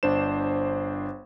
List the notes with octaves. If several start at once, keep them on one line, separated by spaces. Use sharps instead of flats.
G1 D4 C5 E7